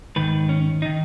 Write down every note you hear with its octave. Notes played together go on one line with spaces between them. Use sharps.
G#2 D#3 B4
C#4
D#4
D#3